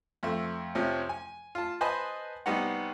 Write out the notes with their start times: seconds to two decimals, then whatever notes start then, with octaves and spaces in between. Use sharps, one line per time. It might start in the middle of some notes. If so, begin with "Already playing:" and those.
0.23 F2 A3
0.75 F2 C3 F3 C#4
1.09 G#5
1.55 F4 A5
1.81 B4 C5 D#5 G#5 A5 B5
2.46 C2 G3 B3 D#4 F#5